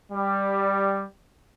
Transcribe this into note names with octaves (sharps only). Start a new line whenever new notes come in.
G3